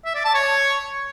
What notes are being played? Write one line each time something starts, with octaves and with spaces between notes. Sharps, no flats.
E5
D5
A5
C#5